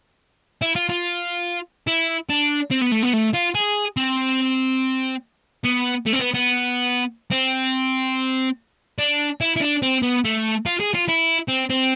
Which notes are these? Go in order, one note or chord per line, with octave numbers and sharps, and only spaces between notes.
E4
F4
F4
E4
D4
C4
B3
A3
B3
A3
F4
G#4
C4
B3
A3
C4
B3
B3
C4
D4
E4
E4
D4
C4
B3
A3
F4
G#4
F4
E4
C4
C4